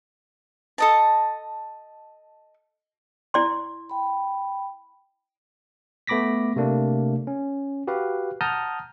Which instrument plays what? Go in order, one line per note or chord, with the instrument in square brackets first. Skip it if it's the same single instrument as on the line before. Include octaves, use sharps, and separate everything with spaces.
[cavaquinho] A4 D#5 A5
[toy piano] E4 D5 C6
[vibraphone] G5 B5
[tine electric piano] A3 B3 B5 D6 A#6 B6
C3 A3 A#3 D4
C#4
F#4 G4 B4 F5
F#5 A5 A#5 D#6 F6 G6